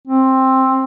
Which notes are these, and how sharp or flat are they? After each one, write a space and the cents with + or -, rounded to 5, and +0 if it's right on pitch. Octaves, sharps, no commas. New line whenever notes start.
C4 +10